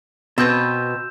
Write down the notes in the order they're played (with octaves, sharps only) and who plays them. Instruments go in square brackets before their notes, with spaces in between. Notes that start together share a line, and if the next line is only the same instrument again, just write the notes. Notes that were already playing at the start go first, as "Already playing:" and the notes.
[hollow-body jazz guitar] B2 [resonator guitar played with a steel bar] C4 B4 [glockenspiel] E6 G6 E7